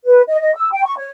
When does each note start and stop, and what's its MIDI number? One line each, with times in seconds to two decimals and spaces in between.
0.06 0.22 71
0.28 0.40 75
0.41 0.52 75
0.56 0.72 88
0.73 0.84 79
0.85 0.97 85
0.97 1.10 73